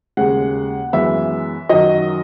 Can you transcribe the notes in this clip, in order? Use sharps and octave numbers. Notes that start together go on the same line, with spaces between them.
D#2 C#3 G#3 F#5
F#2 E3 G#3 B3 E5
F#2 D#3 F#3 D#5